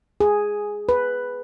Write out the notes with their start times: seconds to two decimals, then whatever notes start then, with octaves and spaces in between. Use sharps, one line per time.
0.20 G#4
0.89 B4